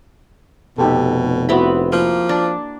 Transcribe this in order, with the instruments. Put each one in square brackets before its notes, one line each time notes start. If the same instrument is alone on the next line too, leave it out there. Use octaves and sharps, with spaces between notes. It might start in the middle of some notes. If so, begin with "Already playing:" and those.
[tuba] F1 [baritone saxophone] B2 [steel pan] D#4 G4 A4
[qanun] B3 C4 B5 [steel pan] E4 F#4
[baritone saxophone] F3 [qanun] A#3
[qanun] D4